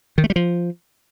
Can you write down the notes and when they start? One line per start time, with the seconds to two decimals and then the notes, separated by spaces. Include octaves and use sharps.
0.18 D#3
0.24 A3
0.30 G3
0.36 F3